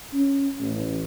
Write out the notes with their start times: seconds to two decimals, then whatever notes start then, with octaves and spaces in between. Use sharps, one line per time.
0.13 C#4
0.60 A1